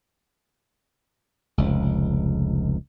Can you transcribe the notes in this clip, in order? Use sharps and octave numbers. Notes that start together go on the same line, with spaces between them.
F1 C#2